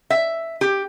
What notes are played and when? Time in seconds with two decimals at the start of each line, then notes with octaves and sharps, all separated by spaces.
0.10 E5
0.61 G4